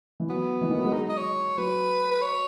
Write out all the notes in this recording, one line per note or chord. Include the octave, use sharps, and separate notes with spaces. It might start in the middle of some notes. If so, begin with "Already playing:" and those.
E3
F#3 B3
E3
D#3
F#3
G#3
F#3 D#4
D#5
C#5
F#3 B4
B4
C#5